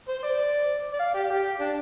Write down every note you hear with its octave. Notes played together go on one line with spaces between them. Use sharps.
C5
D5
D5
F5
G4
G4
D4